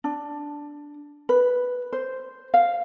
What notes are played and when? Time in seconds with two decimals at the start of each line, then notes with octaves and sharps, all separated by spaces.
0.04 D4
1.29 B4
1.93 C5
2.54 F5